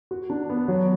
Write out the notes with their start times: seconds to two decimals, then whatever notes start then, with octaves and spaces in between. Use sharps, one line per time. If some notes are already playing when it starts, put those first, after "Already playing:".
0.11 F#4
0.30 D4
0.50 B3
0.68 F#3